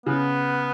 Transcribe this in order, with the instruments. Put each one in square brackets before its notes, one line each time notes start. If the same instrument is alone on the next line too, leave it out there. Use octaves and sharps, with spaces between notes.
[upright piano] C#3 [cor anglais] B3